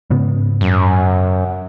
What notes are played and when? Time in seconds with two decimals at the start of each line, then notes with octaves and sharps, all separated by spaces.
0.10 G#2 C#3 B3
0.61 F#2